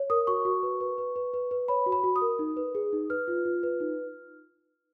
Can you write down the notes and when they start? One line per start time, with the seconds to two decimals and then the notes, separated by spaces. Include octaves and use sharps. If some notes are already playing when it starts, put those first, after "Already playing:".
Already playing: C#5
0.10 A#4 D#6
0.27 F#4 C#6
0.45 F#4
0.63 B4
0.81 B4
0.98 B4
1.16 B4
1.34 B4
1.51 B4
1.68 C#5 B5
1.86 F#4
1.92 B5
2.04 F#4
2.16 D#6
2.22 A#4
2.39 D#4
2.57 B4
2.75 G#4
2.93 D#4
3.10 B4 F6
3.28 F4
3.45 F4
3.63 B4
3.80 D#4